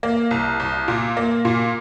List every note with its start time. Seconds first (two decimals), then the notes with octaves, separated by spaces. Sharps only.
0.03 A#3
0.31 C2
0.60 C2
0.88 A#2
1.17 A#3
1.45 A#2